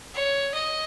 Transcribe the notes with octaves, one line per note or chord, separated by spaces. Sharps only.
C#5
D#5